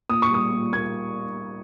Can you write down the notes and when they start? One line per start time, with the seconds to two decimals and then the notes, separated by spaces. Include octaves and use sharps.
0.09 A#2 D#6
0.22 C#6
0.30 G3 D#6
0.52 A#2
0.72 A#3 G#6